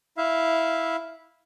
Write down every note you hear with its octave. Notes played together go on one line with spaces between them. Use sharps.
E4 E5 F5